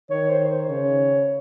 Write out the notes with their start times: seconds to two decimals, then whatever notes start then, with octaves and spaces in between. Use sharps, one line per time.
0.10 D#3 C#5
0.30 C5
0.50 C5
0.69 C#3 C#5